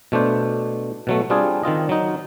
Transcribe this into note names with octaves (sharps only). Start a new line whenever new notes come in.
B2 A3 D4 C5
B2 F#3 A3
G3 C4 D4 F4 G#4
D#3 C4 F4 D#5
F#3 D#4